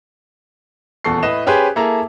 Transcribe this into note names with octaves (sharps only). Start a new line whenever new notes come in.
D#1 E2 A4 C#6 C7
A2 B4 D#5 E7
C#4 G4 G#4 B4 C5
A#3 E4 G#4 A4 A5 A#5